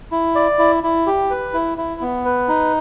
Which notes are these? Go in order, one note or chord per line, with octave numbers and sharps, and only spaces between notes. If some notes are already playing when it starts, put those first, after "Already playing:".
E4
D5
E4
E4
G4
B4
E4
E4
B3
B4
D#4